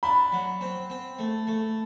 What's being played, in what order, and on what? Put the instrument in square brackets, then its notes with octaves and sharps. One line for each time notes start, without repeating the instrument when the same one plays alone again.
[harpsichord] D4 [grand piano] B5
[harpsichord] F#3
C4
C4
A3
A3